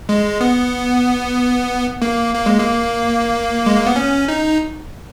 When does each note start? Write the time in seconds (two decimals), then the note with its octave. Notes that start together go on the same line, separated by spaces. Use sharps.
0.09 G#3
0.41 B3
2.02 A#3
2.35 A#3
2.46 G#3
2.59 A#3
3.66 G#3
3.77 A#3
3.86 B3
3.96 C#4
4.28 D#4